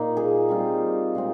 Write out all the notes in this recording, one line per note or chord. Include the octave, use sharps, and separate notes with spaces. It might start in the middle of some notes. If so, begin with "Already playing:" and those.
Already playing: A#2 A#3 D#4 F4
G#4
G3 C4 F4
A#2 G#3 C4